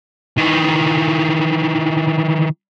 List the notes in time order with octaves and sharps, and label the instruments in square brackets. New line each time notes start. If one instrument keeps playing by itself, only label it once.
[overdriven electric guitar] D#3 E3